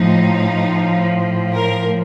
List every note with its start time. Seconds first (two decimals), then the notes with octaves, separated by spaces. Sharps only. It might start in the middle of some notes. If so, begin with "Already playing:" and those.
Already playing: A2 F3 D#4
1.55 A#4